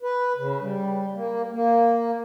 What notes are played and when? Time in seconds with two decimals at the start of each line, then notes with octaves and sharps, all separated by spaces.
0.03 B4
0.38 C#3
0.61 G3
1.14 A#3
1.51 A#3